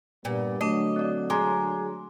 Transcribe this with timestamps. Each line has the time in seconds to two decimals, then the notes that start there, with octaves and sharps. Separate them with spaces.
0.25 G2 A#2 G3 B3
0.61 D3 F#3 A3 D4 D#5
0.96 C4 D5
1.30 G#3 A#5 C6 D6